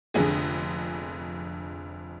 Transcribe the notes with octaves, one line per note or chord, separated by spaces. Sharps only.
F1 F2 D3 G#4